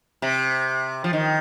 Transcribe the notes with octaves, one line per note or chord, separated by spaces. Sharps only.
C3
F3
D#3